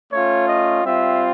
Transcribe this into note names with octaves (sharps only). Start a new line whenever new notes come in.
A3 C#4 F4 C#5
D#5
G3 C4 F4 E5